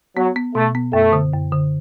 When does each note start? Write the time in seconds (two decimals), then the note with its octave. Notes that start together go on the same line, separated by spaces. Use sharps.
0.17 F#3 B3
0.36 B3
0.55 B2 A3
0.75 B3
0.93 F#2 A3
1.13 D3
1.33 F#2
1.52 D3